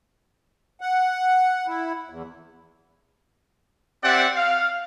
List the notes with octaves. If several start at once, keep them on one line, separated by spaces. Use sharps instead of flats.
F#5
E4
E2
C4 G4 D5 E5 F#5
F5